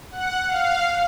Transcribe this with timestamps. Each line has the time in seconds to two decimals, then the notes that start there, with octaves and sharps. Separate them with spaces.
0.11 F#5
0.47 F5